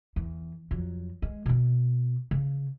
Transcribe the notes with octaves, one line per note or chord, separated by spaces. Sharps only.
E2
F2 F#3
G#3
B2 C4
C#3